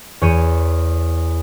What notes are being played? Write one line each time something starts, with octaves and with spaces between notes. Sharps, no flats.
E2 C#5 G6 D#7